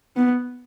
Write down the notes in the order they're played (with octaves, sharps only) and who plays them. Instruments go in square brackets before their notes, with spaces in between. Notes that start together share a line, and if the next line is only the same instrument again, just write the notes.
[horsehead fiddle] B3